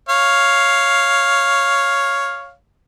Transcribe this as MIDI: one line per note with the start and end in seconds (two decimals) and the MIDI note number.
0.09 2.53 73
0.09 2.53 77